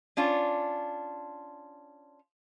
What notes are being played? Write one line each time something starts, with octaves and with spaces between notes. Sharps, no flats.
C#4 D4 F4